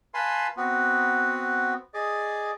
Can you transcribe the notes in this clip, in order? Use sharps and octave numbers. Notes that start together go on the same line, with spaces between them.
B4 F5 G#5 A5 B5 C6
B3 C4 F#4
G#4 D5 D#5